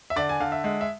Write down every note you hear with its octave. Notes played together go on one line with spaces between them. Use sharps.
E5
D3 D5
G#5
D3 F5
E5
G#3
E5